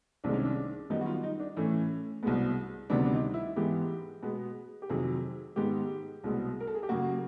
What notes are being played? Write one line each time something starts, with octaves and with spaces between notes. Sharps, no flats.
C2 C3 D#3 G#3 D4
C#4
D4
F#2 D#3 G3 B3 D#4
F#4
F4
D#4
D4
A2 E3 A3 C#4
C2 B2 G#3 B3
D2 C3 D#3 G3 B3 D4
D4
D#4
E4
G#2 E3 G#3 B3 G4
B2 G#3 B3
G4
F2 C3 D#3 F#3 G#4
G#2 D#3 G#3 B3 G4
C2 B2 G#3 B3
A#4
A4
G#4
G4
F#2 C#3 F#3 A#3 F#4